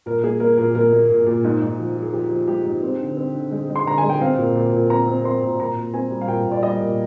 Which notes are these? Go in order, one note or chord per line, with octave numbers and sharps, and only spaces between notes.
A#2 A#4
A#3 G#4
A#3 A#4
A#2 A#4
A#2 A#4
A#3
A#2
A#2
G#2
G#2
F3
F3
G#4
F3 G4
F3
G#3 G4
G#2
C4
D3
C4
D3
G#3
G#3
C6
D3 A#5
G#5
G#3
G5
C4 F5
A#2
A#2
A#2
C4 A#5
C4
C4 C6
A#2
A#2 A#5
A#2
C4 G#5
G3
F5
A#2 G5
A#2
D5
G3 D#5
A#2